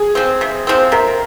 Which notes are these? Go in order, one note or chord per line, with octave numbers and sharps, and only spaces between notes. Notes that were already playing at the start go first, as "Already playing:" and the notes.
Already playing: G#4
F3 C4
C3
F3 C4
C3 A#4